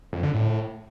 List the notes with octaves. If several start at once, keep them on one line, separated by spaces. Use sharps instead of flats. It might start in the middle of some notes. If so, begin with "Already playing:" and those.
F2
D3
A2